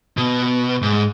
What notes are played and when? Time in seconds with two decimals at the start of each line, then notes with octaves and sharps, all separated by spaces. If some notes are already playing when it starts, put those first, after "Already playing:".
0.17 B2
0.82 G#2